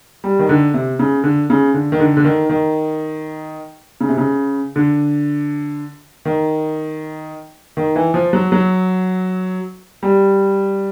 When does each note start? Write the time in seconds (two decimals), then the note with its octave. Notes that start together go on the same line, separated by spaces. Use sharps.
0.24 G3
0.39 D#3
0.49 D3
0.74 C3
0.99 C#3
1.24 D3
1.50 C#3
1.74 D3
1.92 D#3
2.00 D3
2.17 D3
2.25 D#3
2.49 D#3
4.01 C#3
4.09 C3
4.18 C#3
4.76 D3
6.25 D#3
7.77 D#3
7.96 E3
8.14 F3
8.33 F#3
8.52 F#3
10.03 G3